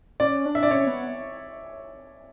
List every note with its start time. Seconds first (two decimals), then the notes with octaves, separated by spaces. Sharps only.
0.20 C#4 D5
0.46 D4
0.55 E5
0.63 D5
0.71 C#4 C#5
0.87 B3